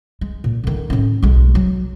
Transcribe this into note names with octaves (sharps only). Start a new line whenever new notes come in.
G#3
A#2
D3 D#3
A2 C#4
B1 G#3
F#3